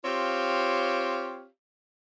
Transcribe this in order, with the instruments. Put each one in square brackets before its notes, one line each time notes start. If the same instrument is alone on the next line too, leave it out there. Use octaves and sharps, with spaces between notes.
[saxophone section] C4 F4 G4 C#5 F5